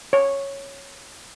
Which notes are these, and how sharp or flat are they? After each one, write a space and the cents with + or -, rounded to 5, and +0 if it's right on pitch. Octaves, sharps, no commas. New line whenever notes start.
C#5 -5